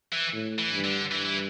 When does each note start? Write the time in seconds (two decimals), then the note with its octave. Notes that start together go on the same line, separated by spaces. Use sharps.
0.13 E3
0.33 A2
0.59 E3
0.72 G2
0.84 D3
1.11 G2 E3
1.25 E3